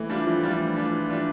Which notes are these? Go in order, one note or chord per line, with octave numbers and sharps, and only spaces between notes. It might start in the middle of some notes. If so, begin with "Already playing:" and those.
Already playing: E3 A3
G3 D4 F4
E3 F3
G3 D4 F4
E3
G3 D4 F4
E3
G3 D4 F4